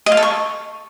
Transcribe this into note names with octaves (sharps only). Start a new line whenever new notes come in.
D#5
F5
A4
C#6